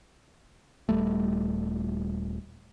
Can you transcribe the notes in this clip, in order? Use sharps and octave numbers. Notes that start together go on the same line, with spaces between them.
D#1 F#2 G3 A3